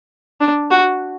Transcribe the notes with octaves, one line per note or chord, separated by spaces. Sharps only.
D4
F#4